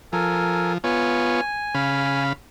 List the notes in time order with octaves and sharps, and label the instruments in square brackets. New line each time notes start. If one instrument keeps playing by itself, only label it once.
[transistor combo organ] F3 [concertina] A4 A#4 G#5
[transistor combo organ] B3 F4 C#5 [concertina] G#5
[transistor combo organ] C#3 F5 B5